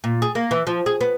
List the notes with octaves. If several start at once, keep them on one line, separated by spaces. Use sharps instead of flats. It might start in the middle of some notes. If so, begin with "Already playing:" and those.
A#2
G#4
A#3
E3
F3
G#4
B3